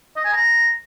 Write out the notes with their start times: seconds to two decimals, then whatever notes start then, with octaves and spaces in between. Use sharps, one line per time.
0.16 D#5
0.25 G#5
0.33 A#5